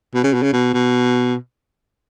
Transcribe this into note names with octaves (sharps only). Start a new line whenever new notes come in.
B2
C#3
B2
C#3
B2
B2